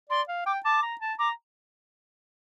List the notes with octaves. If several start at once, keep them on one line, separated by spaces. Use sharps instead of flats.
D5 C6
F5
G5 D6
A5 D6
A#5
A5
A#5 D6